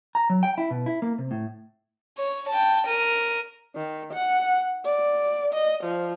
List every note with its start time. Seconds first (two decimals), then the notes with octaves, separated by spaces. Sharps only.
0.15 A#5
0.30 F#3
0.43 G5
0.58 E4
0.71 B2
0.86 E4
1.02 A#3
1.18 C3
1.31 A2
2.18 C#5
2.50 G5 A5
2.87 A#4 D#7
3.75 D#3
4.13 F#5
4.85 D5
5.53 D#5
5.83 F3